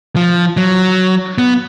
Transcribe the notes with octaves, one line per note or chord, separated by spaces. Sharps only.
F3
F#3
B3